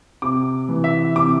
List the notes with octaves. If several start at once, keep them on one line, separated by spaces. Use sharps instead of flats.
C3 D6
E3
E5
C3 D6